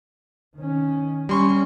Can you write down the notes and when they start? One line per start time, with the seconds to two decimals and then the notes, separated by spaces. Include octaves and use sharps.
0.56 D#3 C#4
1.29 G3 C#4 C6 C#6